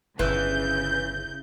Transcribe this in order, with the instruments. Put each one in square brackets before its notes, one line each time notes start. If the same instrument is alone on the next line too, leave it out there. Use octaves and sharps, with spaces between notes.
[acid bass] G1 [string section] C#3 G6 [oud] E3